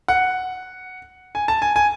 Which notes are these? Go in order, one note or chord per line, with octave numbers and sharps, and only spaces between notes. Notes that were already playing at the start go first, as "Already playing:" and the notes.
F#5
G#5
A5
G#5
G#5